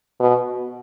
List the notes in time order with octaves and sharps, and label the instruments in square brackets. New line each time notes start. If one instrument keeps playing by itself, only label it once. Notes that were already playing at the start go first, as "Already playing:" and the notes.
[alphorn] B2